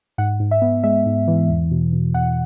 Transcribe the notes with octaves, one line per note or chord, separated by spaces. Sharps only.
G#2 F#5
G#2
E5
B3
G#3 E5
G#2
E3
E2
B2
B2
E2 F#5